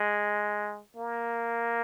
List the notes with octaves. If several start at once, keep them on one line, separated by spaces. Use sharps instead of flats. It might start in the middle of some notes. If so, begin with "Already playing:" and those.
Already playing: G#3
A#3